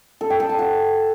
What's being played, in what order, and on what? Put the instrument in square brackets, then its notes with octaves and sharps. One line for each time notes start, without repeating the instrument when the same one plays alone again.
[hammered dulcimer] A4
G5
A4
A5
F#4